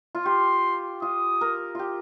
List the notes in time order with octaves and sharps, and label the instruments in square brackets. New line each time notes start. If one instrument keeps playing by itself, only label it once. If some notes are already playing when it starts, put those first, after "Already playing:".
[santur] F4
[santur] G4 [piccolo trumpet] C6
[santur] F4 [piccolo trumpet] D#6
[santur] A#4
F4 G4